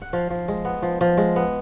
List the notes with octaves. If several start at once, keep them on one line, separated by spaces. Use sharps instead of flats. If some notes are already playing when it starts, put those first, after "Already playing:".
F#5
F3 F5
F3
G#3
B3
F3
F3
G#3
B3